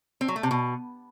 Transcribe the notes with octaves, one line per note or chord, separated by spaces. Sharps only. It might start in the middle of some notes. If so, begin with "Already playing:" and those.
C4
F#3
A3
C3
B2